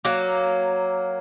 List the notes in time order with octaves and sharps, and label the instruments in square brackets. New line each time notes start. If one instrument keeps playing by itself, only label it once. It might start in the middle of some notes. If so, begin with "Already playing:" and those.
[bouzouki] F#3 A#3